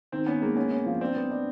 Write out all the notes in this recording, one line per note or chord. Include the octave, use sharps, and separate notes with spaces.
D#3 C4
B3 C#4
G#3 A#3
B3 C#4
C#4
F3
C4 D4
B3
D4